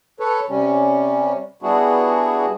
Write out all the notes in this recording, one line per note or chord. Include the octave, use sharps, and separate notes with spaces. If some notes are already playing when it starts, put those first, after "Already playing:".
A4 B4 C#5
C3 G3 C#4
G3 B3 D4 E4 F#4 G#4